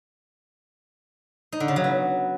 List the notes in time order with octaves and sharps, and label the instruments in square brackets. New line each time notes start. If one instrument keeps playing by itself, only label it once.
[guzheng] D#4
D3
C#3
F#3
B3